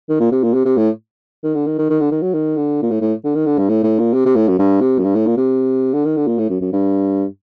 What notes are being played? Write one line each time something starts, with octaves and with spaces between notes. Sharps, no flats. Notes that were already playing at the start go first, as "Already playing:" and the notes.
D#3
A#2
C3
A#2
C3
C3
A2
D#3
D3
D#3
D#3
D#3
D3
D#3
F#3
D#3
D3
A#2
A2
A2
D3
D#3
D3
G2
A2
A2
A#2
C3
C3
A2
F#2
G2
C3
F#2
G2
A2
A#2
C3
D3
D#3
D3
A#2
A2
F#2
F#2
G2